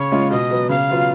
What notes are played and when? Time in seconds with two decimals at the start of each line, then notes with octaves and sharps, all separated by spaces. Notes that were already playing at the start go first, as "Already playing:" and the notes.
Already playing: C#3 C#5
0.12 G#3 C#4 F4
0.30 B2 D#5
0.50 F#3 B3
0.69 C#3 F5
0.90 F#3 B3 F4